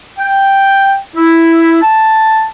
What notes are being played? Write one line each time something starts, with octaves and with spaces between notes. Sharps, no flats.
G5
E4
A5